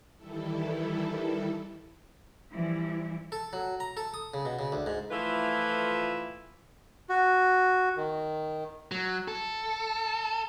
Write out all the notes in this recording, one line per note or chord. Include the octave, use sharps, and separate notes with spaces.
D#3 E3 G3 E4 A4
E3 F3 G3 E4
A4
F#3
A#5
A4
D#6
C#3
B2
C#3
D2
G#2
E3 F3 A3 E4 F4 B4
F#4
D#3
F#3
A4